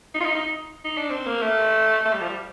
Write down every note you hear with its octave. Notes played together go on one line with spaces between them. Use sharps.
D#4
F4
D#4
D#4
D#4
D4
C4
A#3
A3
A3
G3
F3
G3